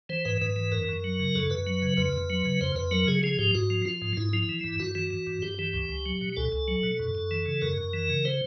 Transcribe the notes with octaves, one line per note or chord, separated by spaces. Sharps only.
E3 C5
G#2 B4
G#2 B4
E3
F#2 A#4
F#2
F#3
C#3
F#2 A4
F#2 B4
F#3
C#3
F2 B4
F2
F#3
C#3
F2 C5
F2 B4
F#3 A#4
C#3 G#4
F3 G#4
G#2 G4
G#2 F#4
F3
F3 F4
G#2
G#2 E4
F3 E4
E3
G2
G2 F#4
E3 F#4
E3
G2
G2 G4
E3 G4
C#2
C#2
F#3
B2
C#2 A4
C#2
F#3
B2
F#2
F#2
E3
C#3
F#2 A#4
F#2
E3
C#3
C5